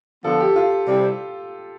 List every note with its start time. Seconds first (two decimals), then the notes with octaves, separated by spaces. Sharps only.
0.24 D3 F3 B3 F4 A4
0.40 G4
0.56 F4
0.86 C3 G3 C4 E4